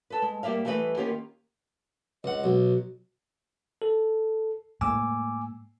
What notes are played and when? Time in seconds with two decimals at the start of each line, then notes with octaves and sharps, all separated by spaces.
0.10 A4 B4
0.22 G#3
0.43 G3 A#3 D5 E5 F5
0.65 E3 G3 A3 B3 B4 D#5
0.97 D#3 A#3 B3 C#4 F4 G4
2.24 C#2 D#5 F#5
2.44 B1 F#4
3.82 A4
4.81 A2 G#3 A#3 G#5 D6 E6